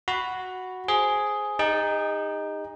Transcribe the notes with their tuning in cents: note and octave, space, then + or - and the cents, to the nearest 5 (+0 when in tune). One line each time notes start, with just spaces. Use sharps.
F#4 +0 B5 +0
G#4 +5 C5 +0
D#4 +0 G#4 -45